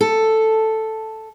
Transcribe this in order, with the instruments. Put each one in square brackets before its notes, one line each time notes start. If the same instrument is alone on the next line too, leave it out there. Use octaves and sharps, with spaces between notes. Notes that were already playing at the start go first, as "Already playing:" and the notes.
[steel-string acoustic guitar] A4